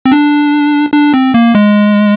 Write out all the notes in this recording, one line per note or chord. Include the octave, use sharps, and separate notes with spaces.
C4
D4
D4
C4
A#3
G#3